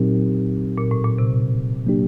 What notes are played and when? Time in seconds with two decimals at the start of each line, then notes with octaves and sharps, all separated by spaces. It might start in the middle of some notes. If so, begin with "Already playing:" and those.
Already playing: A#2 F#3 C4 D#4 G4
0.78 A#2
0.91 A2
1.04 A#2
1.18 C3
1.86 F#3 A#3 D4 G4